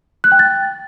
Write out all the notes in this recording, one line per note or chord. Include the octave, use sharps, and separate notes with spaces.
F#6
G5
A6